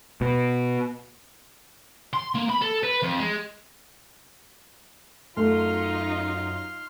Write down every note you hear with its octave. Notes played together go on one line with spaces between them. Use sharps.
B2
C6
A#3
B5
A4
B4
F2
G#3
F#2 A3 D#4 F4 C6 F6